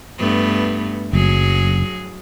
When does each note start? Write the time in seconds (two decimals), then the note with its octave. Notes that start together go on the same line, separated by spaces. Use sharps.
0.19 G2 A3 B3
1.13 F#1 F#3 G#4